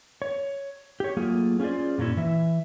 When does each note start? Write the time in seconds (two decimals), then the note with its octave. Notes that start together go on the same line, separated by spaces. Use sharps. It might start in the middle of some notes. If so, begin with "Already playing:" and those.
0.22 C#5
1.00 G4 C#5
1.17 F#3 A3 A#3 F4 G#4
1.60 C#4 F4 G#4 C5 D5
1.98 F#2 A#2 F#3 C#4 E4
2.17 E3 E5